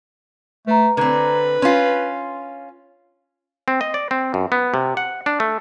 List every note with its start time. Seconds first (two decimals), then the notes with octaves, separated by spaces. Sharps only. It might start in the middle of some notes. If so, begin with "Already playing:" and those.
0.67 A3 B4 A#5
0.97 D3 C4 B4 A#5 G#6
1.62 C#4 F4 C6
3.68 C4
3.81 D#5
3.94 D5
4.11 C4
4.34 F#2
4.52 B3
4.74 C3
4.97 F#5
5.26 D4
5.40 A3